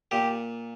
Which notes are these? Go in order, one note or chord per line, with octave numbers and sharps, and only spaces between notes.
A#2 G4